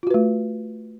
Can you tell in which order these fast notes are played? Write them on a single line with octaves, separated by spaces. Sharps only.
F4 F#4 B4 A3